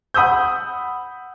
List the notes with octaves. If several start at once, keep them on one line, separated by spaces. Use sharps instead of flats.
F#5 B5 D#6 E6 G6